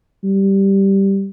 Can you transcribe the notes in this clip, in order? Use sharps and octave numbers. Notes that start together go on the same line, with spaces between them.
G3